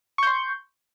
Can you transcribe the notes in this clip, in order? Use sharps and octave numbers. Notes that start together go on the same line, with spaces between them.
C6 C#6 G6